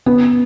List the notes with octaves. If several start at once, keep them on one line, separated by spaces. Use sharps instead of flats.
B3